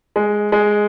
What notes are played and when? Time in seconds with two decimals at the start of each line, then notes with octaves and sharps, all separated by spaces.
0.16 G#3
0.52 G#3